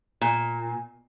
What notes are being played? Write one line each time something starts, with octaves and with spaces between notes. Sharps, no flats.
A#2